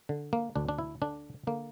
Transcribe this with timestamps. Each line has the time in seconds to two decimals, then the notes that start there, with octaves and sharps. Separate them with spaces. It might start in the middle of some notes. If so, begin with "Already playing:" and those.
0.09 D3
0.33 A#3
0.55 D2 D4
0.69 D4
0.79 E4
1.02 D3 D4
1.47 D3 A#3